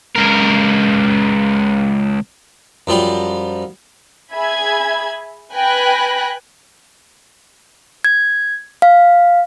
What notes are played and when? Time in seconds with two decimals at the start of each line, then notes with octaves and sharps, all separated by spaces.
0.16 C#2 A#4
2.87 F#2 F3 G3 C6
4.33 G#4 E5 G#5 B5 G#6
5.53 B4 G5 G#5 B5 F#6 A#6
8.04 G#6
8.82 F5